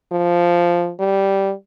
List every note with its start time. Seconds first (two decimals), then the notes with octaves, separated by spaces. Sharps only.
0.12 F3
1.00 G3